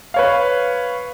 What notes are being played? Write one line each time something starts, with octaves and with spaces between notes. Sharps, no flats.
B4 C#5 F5